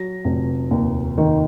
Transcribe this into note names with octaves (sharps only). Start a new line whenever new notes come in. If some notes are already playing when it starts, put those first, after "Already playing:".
Already playing: F#3 A#6
F1
D#2
D#3